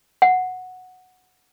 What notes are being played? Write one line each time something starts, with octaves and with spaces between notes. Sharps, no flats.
F#5